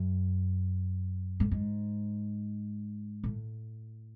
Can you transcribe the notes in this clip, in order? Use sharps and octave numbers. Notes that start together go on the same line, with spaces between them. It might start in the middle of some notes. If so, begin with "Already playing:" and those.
Already playing: F#2
A2
G#2
A2